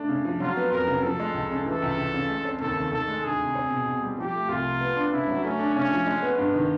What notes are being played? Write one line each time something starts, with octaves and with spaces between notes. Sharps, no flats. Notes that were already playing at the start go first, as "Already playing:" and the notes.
Already playing: A3 D4
C#3
F3
F#3 F4
B3
F2 A#4
C#3
F3 A4
G#3
C#2
C#3
E3 A4
C#2
C#2
C#3
G#3
C4
D#2 A4
D#3
D#3 A4
G#3
D2 G#4
C3
C4
B2
B2
G3
F3 G4
A3
C2 F4
C3
B3
D4
C#3 E4
F#3
A3 C#4
D4
C#3 C#4
F3
G#3
B3
G2
D#3